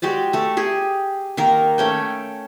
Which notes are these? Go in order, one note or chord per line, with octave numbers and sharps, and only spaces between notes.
G#3 F#4 G4 D5
A3 A4
G4 G#4
D#3 A#3 A#4
A3 C#4 G5